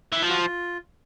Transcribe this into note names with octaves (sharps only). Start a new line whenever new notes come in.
E3
F3 F4
F#4
F4